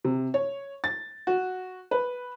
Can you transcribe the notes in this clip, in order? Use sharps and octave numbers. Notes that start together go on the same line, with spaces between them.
C3
C#5
A6
F#4
B4